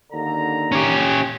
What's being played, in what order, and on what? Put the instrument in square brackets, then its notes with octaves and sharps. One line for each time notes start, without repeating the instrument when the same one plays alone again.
[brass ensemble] D#2 D3 A#5
[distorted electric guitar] C#4 G4